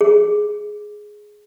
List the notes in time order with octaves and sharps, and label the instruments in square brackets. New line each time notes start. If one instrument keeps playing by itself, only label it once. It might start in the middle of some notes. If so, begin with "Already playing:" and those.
[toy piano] G#4